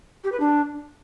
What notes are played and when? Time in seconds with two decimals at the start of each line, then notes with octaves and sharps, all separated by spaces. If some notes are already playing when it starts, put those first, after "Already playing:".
0.24 G4
0.32 B4
0.40 D4